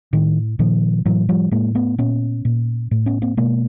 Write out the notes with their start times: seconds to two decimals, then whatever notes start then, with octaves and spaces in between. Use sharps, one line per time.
0.13 A2 D#3
0.59 A#2 D#3 F3
1.06 A2 E3 F#3
1.29 F3 G3
1.51 A2 G#3 A#3
1.75 A3 B3
1.98 A#2 B3 C#4
2.45 A#2
2.91 A2
3.06 B3 C#4
3.22 A#3 C4
3.37 B2 G#3 A#3